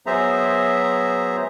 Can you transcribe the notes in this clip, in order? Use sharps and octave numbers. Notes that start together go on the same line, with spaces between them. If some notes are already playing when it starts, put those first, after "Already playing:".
F#3 B3 G#4 C5 E5 A#5